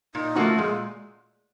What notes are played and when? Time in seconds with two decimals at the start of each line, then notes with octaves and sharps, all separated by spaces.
0.15 A#2 D#4
0.36 F3 A3 A#3 C#4 F#4
0.58 A#2 G#3